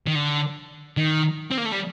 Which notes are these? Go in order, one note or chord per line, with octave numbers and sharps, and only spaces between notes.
D#3
D3
D#3
C4
A#3
A3
G3